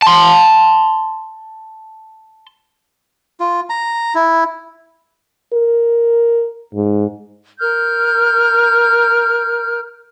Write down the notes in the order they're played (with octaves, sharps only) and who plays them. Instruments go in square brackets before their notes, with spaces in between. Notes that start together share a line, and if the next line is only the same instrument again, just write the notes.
[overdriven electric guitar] A5 C6
[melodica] F4
A#5
E4
[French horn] A#4
G#2
[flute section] A#4 F6 G6